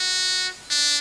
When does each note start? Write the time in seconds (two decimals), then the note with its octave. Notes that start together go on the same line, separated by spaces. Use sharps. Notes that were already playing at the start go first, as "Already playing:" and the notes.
Already playing: F#4
0.70 D4